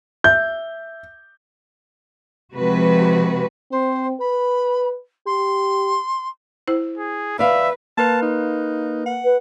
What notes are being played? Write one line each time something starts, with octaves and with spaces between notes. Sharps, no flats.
E5 G6
C3 F3 G#3 F#4 B4
C4 C5
B4 B5
G4 C6
E4 C5
G#4
B4 D5 E5 F5
A#3 A#4 B4 A5
D#4
F#5
B4